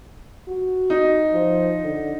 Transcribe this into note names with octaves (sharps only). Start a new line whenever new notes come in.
F#4
D#4
F3
D3